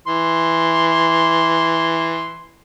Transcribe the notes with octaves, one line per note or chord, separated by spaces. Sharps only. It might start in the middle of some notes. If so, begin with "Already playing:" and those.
E3 C6